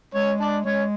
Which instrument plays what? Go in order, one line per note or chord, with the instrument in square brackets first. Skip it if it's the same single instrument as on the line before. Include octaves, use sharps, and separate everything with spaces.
[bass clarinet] G#3 [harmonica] C#4 C#5
[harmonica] D4 D5
[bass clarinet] G#3 [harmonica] C#4 C#5